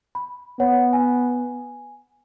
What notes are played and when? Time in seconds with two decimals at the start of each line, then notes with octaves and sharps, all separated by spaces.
0.15 B5
0.60 B3 C#5 F#5
0.93 G#5